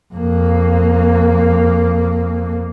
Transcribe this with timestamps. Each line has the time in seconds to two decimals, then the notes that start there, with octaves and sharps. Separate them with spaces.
0.14 F2 A#3